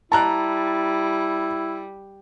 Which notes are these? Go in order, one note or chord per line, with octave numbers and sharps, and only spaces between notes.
G3 E4 A5 A#5 F#6